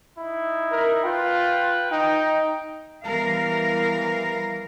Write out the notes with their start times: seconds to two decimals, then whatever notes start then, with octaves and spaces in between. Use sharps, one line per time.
0.19 D#4 E4
0.72 A#4
1.05 F4 B4 G5
1.92 D#4 G5
3.06 E3 G3 B3 A#4 F5